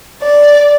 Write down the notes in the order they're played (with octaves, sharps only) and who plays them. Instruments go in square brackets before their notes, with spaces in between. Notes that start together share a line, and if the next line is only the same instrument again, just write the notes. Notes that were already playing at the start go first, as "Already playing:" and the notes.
[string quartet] D5